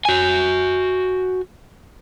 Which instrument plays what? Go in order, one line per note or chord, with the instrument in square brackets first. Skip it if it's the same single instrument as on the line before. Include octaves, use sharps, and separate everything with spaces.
[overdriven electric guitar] F#4 G#5